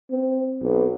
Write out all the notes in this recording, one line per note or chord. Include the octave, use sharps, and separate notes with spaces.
C4
B1